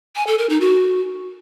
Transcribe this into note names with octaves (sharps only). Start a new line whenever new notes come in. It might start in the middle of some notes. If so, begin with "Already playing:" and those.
G#5
A4
A#4
D#4
F#4